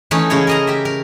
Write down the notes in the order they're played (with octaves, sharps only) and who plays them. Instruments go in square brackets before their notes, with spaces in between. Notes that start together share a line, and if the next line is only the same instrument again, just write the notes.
[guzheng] E3 A3 C#4 D#4
C#3 G#3 C#4 E4 C#5
A#4 D#5 A#5
G4 E5
A#4